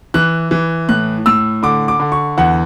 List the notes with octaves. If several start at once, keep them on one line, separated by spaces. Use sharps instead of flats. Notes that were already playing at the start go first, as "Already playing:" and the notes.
E3 F#6
E3
A2 F#6
A2 E6
D3 D6
D6
D3
C#6
E2 F#5